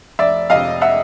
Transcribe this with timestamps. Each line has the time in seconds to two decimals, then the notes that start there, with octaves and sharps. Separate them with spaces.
0.19 F1 D5 E5
0.50 F2 C3 D#5 F5
0.81 E5 F#5